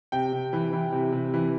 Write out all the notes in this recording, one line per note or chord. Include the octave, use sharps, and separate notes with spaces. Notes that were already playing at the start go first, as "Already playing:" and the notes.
C3 G5
C3
E3
E3
C3
C3
E3